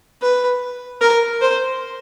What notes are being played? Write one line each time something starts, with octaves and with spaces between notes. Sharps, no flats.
B4
A#4
C5